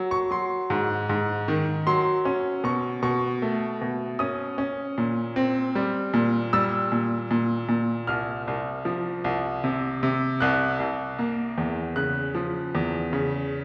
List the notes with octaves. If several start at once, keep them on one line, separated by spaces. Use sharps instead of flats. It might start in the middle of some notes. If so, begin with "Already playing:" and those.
Already playing: F#3
C#6
F#3 C6
G#2
G#2
D#3
F#3 C6
C#4
B2 C#6
B2 C#6
A3
B2
C#4 D#6
C#4
A#2
C4
G3
A#2
G3 E6
A#2
A#2
A#2
C2 F6
C2
F3
C2
C3
C3
C2 F#6
C2
A#3
E2
C#3 F#6
F3
E2
C#3